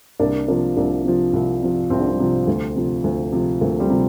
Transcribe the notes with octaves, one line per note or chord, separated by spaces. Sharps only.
C2 A#3 D4
C3 F3 A#3 D4
C2 A#3 D4
C3 F3
C2
C3 F3
C2 C4
D4
G3 C4
C3 F3
D2
C3 F3
D2
C3 F3
D2 A#3
G3 C4
C3 F3